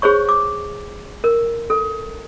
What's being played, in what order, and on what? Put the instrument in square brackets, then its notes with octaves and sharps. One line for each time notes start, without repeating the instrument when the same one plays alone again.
[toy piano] G#4 C5 C#5 C#6
D6
A#4
A4